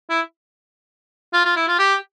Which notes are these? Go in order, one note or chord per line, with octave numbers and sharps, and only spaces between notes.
E4
F4
F4
E4
F4
G4